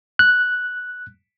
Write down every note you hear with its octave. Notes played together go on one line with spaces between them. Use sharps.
F#6